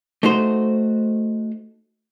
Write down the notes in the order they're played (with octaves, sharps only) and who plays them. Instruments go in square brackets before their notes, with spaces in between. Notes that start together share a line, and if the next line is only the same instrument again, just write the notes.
[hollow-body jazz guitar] A3 D#4 F#4 C5